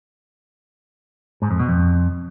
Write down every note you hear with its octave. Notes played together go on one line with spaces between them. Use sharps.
G#2
F2
B2
F2